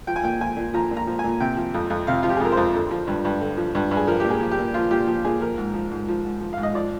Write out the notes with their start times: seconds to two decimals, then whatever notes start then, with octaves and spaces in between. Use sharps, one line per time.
0.07 F3 G5
0.16 G#5
0.23 A#2 G5
0.41 F3 G#5
0.57 A#2
0.74 F3 A#5
0.91 A#2
0.97 A#5
1.07 F3
1.19 A#2 G#5
1.40 C3 G5
1.57 F3
1.74 F2
1.90 F2
2.07 C3 F5
2.23 F3 F4
2.29 G4
2.37 G#4
2.40 F2 A#4
2.52 C5
2.57 F2
2.75 D3
2.91 F3
3.07 G2
3.25 G2
3.40 D3
3.57 F3
3.75 G2
3.91 G2
3.97 G#4
4.07 F3 A#4
4.20 G4
4.24 A#2
4.30 G#4
4.41 F3
4.52 G4
4.58 A#2
4.74 F3 F4
4.91 A#2 G4
5.07 F3
5.25 A#2 G#4
5.41 F3 A#4
5.58 G#2
5.74 F3
5.91 G#2
6.08 F3
6.25 G#2
6.41 F3
6.53 G#2 F5
6.63 D#5
6.74 F3 D5